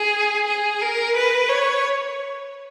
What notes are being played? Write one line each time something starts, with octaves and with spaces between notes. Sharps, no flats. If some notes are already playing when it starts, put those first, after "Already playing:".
Already playing: G#4
G#4
A#4
B4
C#5